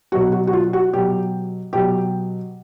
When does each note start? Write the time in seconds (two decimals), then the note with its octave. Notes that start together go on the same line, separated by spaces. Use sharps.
0.12 B2 F#3 F#4
0.32 F#4
0.47 F#4
0.53 F4
0.73 F#4
0.93 B2 F#3 G4
1.73 B2 F#3 G4